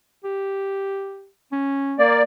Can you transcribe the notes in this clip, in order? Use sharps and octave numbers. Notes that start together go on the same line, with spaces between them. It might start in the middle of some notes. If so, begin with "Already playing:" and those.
G4
C#4
A#3 D5